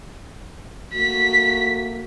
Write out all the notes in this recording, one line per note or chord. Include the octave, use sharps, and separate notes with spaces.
A3 A#3 F#4 B6